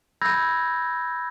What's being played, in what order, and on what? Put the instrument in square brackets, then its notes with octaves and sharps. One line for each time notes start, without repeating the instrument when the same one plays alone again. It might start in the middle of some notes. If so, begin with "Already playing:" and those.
[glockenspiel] B5 E6 G6 G#6 A#6